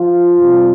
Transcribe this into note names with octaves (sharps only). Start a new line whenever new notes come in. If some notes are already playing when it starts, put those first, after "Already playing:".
Already playing: F3 F4
F2 C3 G3